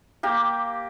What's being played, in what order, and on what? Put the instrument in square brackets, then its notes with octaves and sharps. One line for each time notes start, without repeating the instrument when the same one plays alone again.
[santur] A#3 G4